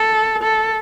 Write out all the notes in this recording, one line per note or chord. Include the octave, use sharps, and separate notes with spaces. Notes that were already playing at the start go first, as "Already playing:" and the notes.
Already playing: A4
A4